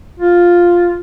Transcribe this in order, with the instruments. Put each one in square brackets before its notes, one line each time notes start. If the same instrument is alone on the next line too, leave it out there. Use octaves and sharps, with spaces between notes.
[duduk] F4